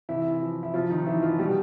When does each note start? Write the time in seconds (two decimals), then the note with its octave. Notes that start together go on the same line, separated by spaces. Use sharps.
0.09 C3 E3 E4
0.42 F3
0.63 E4
0.74 C3 F3 F4
0.90 D#3 D#4
1.06 E3 F3 E4
1.23 F3 F4
1.39 B2 G3 G4